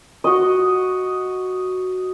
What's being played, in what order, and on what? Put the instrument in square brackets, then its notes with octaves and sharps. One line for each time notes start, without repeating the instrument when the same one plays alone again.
[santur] F#4 D#5